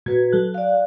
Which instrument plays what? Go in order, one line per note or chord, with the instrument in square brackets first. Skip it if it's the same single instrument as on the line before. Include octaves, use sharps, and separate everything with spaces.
[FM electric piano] A#2 G#6 [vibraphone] F#4 B4
[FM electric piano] F#3 A4 F#6
[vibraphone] D5 F5